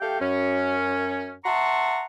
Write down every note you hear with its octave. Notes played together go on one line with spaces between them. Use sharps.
A3 G4 A4 F5 G5
F#2 C#4
E5 F#5 A5 A#5 C6 C#6